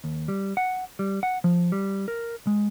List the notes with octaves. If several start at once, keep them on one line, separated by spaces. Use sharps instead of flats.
D#2
G3
F#5
G3
F#5
F3
G3
A#4
G#3